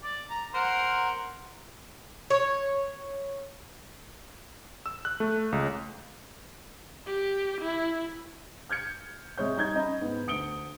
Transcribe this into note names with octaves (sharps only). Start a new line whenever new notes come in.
D5
A#5
A#4 C5 F#5
C#5
E6
F#6
A3
C#2
G4
E4
F6 G6 G#6 C#7
C3 G#3 C#5 G6
G3 D#4 G6 G#6
C#4 D#5 A#5 B5
G#2 B3
D2 D#6 C#7 D7 G7